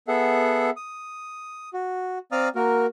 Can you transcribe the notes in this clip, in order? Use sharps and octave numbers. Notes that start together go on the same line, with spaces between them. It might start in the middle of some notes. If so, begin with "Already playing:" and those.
B3 G#4 A4 E5 F#5
D#6
F#4
C4 D5 F5 A#5 D#6 F6
A#3 F#4 A#4